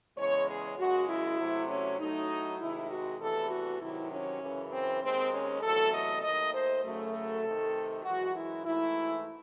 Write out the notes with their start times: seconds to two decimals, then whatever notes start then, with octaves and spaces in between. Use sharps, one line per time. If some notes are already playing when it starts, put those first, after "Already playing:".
0.17 E2 C#3 G#3 C#5
0.48 G#4
0.78 F#2 C#3 G#3 F#4
1.08 E4
1.38 C3 F#3 A3
1.68 C#4
1.99 A2 F#3 A3 D#4
2.59 C3 D#3 G#3 E4
2.89 F#4
3.20 E2 C3 E3 A3 A4
3.50 F#4
3.80 C3 D#3 F#3 E4
4.10 C#4
4.41 F#2 C#3 E3
4.72 C4
5.02 D#2 D#3 G#3 C4
5.32 C#4
5.62 E2 C3 F#3 A3 A4
5.92 D#5
6.22 D#2 D#3 A3 D#5
6.53 C5
6.84 F#2 C#3 F#3 A3
7.14 A4
7.44 C3 D#3 A3
8.04 F#2 E3 G#3 F#4
8.34 E4
8.65 G#2 E3 A3 E4